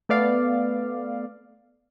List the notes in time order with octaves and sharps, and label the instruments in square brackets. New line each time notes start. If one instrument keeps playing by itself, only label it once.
[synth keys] A3 B3 D5 F5